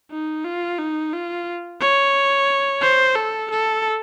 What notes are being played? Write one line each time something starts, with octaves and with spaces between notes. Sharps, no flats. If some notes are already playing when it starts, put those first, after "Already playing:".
D#4
F4
D#4
F4
C#5
C5
A4
A4